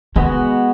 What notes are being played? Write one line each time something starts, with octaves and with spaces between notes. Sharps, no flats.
D#3 G#3 B3 F#4